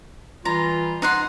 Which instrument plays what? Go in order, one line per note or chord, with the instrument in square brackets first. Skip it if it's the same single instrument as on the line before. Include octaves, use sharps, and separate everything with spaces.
[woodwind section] E3 G3 F4 [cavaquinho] A#5
[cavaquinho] D#4 F#5 C6